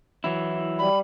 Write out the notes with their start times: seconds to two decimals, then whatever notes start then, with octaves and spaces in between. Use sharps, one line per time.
0.24 E3 F#3 E4
0.78 G3 B5